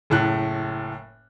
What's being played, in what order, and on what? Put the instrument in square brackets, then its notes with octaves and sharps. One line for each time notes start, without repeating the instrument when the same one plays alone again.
[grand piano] F#1 A2 F#6